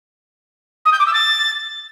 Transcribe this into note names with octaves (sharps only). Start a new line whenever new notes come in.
D#6
G6
D6
E6
A6